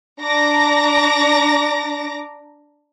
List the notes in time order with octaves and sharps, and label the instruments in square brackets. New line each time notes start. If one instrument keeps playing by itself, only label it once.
[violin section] D4 A#5 D6 A#6